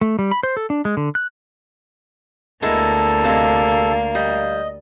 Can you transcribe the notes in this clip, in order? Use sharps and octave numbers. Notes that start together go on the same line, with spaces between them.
A3
G3
B5
C5
A4
D4
G#3
D3
F#6
D2 G#3 A#3 B3 E4 A4 A5
C3 G#3 F5
G3 D#5